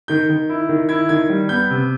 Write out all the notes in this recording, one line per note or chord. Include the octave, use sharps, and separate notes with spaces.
D#3 G6
D#3
E4
D#3
E4 G#6
D#3 G#6
G3
B3 G6
C3